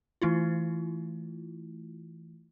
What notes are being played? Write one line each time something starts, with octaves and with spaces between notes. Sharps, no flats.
E3 A3 E4 F4